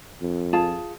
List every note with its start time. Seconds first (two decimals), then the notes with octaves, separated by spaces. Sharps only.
0.22 F2
0.53 F4 G#4 A5